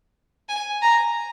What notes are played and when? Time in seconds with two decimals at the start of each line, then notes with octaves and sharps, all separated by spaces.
0.49 G#5
0.82 A#5